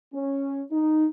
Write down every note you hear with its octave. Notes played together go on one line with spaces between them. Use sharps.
C#4
D#4